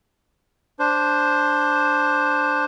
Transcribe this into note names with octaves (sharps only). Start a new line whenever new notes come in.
D4 C5